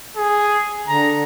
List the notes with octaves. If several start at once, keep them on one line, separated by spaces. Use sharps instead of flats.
G#4
D3 A#5